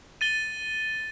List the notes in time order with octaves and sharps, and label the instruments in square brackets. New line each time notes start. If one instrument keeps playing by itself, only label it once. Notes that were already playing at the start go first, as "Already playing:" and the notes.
[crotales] A6 D#7 G7